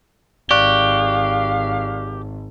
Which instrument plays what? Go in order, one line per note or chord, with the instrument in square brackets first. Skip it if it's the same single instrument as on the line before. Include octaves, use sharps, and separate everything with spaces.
[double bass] G#1 [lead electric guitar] G4 [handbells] D5 C#6 F#6 [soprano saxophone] F5